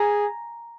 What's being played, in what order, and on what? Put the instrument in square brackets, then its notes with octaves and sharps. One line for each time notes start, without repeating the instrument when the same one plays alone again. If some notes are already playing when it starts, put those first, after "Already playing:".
Already playing: [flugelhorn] G#4 [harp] G#5 A#5